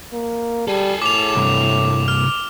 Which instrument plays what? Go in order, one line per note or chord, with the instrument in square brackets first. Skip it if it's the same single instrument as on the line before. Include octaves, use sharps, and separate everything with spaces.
[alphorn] A#3
[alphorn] G3 [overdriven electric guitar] G#4 A4
[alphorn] A2 [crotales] D6 F7
[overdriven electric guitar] C2 G2
[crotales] F6